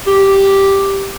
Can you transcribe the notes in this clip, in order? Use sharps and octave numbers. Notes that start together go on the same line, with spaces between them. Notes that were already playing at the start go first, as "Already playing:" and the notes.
G4